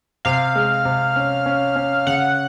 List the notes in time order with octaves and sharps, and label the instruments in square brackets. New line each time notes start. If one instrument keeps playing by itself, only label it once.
[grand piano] C3 [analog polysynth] F5
[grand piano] G#3
C3
C#4
C#4
C#4
[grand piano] C#3 [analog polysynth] F#5